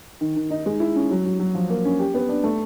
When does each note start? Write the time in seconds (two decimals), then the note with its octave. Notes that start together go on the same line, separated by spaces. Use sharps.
0.21 D#3
0.36 D#3
0.50 D#4
0.66 G#3
0.80 E4
0.96 C#4
1.11 F#3
1.25 F#3
1.39 F#3
1.54 F3
1.69 A#3
1.85 C#4
1.99 G4
2.14 B3
2.29 D4
2.44 A3